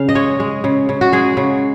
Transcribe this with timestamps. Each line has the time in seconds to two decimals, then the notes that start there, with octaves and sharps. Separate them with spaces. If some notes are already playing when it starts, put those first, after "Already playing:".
Already playing: C#3 F5
0.09 D#5
0.15 G#3 C#5
0.40 G#3
0.64 C#3
0.89 C#3
1.01 F#4
1.12 G#3 G#4
1.37 C#3